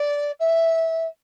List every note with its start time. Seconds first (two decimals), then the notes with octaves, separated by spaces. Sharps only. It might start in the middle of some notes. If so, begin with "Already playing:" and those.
Already playing: D5
0.39 E5